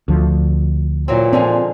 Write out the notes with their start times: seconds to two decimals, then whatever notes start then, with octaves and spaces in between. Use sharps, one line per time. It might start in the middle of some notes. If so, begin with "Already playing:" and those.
0.08 D2 F3
1.08 A#2 E3 F#3 C4
1.33 D3 F3 G#3 C4